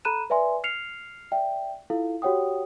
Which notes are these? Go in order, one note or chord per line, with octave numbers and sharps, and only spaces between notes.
A4 A#5 B5 F#6 D#7 E7
B4 D5 E5 G#5 C6
F6 C7 C#7 F7
D5 E5 G5
E4 F4 A4 F5
F#4 G4 C#5 F#5 G5 D#6